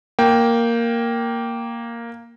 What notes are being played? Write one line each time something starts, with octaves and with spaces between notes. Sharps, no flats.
A#3 G5